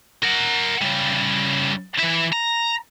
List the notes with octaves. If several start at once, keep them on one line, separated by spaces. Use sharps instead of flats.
A#4 F#5
C#3 G3
E3 E4
A#5